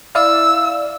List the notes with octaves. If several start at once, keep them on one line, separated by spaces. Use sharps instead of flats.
E4 D5 F5 E6